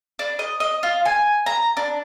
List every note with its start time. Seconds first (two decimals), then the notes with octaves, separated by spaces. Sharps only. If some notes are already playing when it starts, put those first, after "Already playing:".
0.19 D4
0.39 D#5
0.60 D#5
0.83 F4
1.05 G#5
1.46 A#5
1.77 D4